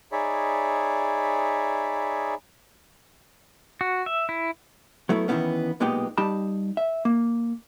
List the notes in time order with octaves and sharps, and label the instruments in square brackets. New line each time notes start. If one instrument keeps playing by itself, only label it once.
[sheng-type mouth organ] D#4 G#4 C#5 D5 E5 B5
[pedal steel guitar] F#4
E5
E4
[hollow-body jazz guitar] F#3 A3 B3 E4
D#3 E3 F#3 A#3 B3 C#4
B1 A#2 G#3 B3 D#4 G4
G3 D#4 G4 A5 B5
E5
A#3